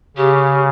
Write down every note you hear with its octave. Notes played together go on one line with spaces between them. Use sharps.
C#3 G4